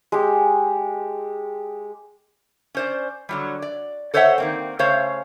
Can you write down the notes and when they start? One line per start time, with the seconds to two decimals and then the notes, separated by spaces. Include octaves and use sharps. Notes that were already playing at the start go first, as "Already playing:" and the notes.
0.12 G#3 G4
2.75 C#4 C5 D5
3.29 D3 F#3 G3
3.62 D5
4.14 A4 C5 C#5 D#5 E5 F#5
4.38 D#3 A#3 C4
4.79 C#3 A3 C5 C#5 F5